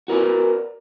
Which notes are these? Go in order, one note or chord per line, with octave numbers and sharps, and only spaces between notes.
F#4 A#4 B4 D5